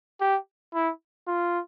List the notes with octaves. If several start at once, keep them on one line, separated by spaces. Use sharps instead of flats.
G4
E4
F4